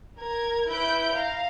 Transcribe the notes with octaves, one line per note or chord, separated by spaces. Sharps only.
A#4 G#6
E4 B4 B5 G6 D7
F5 A#5